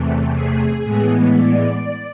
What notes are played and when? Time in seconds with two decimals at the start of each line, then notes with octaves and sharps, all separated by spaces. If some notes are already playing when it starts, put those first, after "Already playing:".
Already playing: E2 C3 E3 A3
0.33 G#4
0.84 A2 E3 G#3 B3
1.34 D5